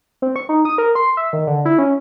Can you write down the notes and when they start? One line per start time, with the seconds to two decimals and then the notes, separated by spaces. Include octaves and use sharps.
0.22 C4
0.36 C#6
0.49 D#4
0.65 D#6
0.78 A#4
0.95 C6
1.17 E5
1.33 D#3
1.47 D3
1.65 E4
1.78 C#4